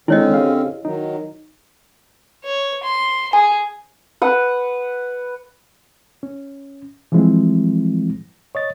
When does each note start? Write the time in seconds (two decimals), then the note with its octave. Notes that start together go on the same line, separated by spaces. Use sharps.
0.08 D3 D#3 G#3 C4 C#4 E4 C#5 D#5
0.34 G4 G#4 F5
0.85 D#3 F#3 D#4
2.44 C#5
2.83 C6
3.33 G#4 G#5
4.22 B4 F#5
6.23 C#4
7.12 E3 F3 G3 G#3 C4 E4
8.55 C#5 D#5 A6